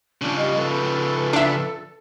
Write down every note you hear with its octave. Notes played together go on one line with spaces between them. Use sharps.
C#3 F3 D4
G3 D#5
A4 B4
D4 E5